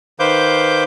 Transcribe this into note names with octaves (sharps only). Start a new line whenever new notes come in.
D#3 B4 C5 F5 D6 G6